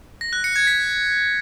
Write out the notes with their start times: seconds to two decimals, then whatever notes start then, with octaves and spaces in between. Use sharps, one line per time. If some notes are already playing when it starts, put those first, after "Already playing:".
0.21 A#6
0.33 F#6
0.44 C#7
0.56 G#6
0.67 B6